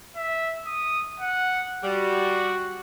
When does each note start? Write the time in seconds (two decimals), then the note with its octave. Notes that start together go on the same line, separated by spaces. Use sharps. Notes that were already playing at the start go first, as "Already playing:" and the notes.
0.16 E5
0.67 D#6
1.20 F#5
1.83 G3 F#4